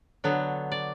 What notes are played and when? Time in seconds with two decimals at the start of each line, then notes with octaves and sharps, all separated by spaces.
0.24 D3 F#3 B3
0.72 D5